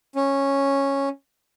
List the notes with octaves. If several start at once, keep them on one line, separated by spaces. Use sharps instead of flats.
C#4